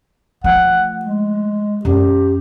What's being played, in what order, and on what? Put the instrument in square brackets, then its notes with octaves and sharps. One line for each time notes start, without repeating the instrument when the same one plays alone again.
[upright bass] F3 A3 [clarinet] F#5
[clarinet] G#3
[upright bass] F#2 [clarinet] G4